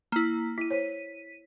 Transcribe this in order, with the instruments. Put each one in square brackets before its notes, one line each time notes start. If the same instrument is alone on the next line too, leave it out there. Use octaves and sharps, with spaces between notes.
[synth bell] A#3 E4
[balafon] E4 [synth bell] B6 D#7
[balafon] C5 C#5